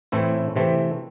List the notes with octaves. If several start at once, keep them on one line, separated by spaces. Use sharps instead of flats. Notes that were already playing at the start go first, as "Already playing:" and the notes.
A2 E3 A3 C4 E4
C3 E3 A3 C4